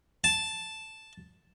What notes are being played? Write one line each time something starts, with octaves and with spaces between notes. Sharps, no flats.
A5